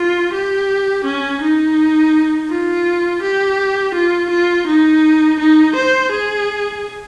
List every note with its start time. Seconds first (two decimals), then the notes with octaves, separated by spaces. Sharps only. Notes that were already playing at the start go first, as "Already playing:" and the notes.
Already playing: F4
0.33 G4
1.05 C#4
1.41 D#4
2.50 F4
3.22 G4
3.94 F4
4.30 F4
4.67 D#4
5.39 D#4
5.76 C5
6.11 G#4